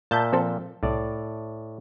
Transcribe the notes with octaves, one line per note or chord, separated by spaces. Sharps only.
A#2 E5 A5 G6
F3 C4 A4
C2 A2 D5